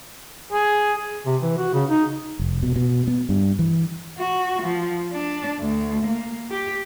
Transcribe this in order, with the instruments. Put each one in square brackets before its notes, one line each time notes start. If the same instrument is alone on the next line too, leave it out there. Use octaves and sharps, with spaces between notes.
[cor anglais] G#4
[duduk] C3
E3
F#4
C#3
D#4
[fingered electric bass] F1
B2
B2
B3
G2
E3
[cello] F#4
F3
D4
D2
A#3
G4